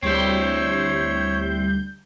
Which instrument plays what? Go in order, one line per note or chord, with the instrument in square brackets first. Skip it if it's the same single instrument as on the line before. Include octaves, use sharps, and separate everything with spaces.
[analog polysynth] D2 G3 G6 [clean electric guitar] C4 E4 [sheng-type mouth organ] C#5